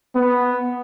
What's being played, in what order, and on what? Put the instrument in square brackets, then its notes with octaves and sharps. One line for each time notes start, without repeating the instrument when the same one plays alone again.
[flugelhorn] B3